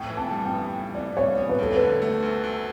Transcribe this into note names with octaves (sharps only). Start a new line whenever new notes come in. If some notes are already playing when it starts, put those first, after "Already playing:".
Already playing: A2 G5
E3
A5
G3
G5
B3
A2
E3 D5
G3 C#5
B3 C#5
B4
D2 A4
D3 B4
A3
D2
D2